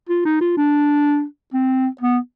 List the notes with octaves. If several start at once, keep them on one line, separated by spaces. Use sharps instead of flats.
F4
D#4
F4
D4
C4
B3